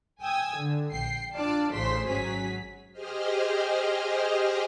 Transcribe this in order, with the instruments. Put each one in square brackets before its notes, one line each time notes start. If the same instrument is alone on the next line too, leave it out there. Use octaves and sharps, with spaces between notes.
[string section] G5 G#5 D#6 E6 G#6
D3
A#1 G5 C7
D4 F4 D5 A5
A1 C#3 C5 C6 B6
G#1 F#3 C#4 G#4 B6
[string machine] G4 G#4 C5 D#5 F6